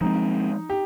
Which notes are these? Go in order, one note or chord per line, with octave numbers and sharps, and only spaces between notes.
F3 G#3 C4 D#4
G4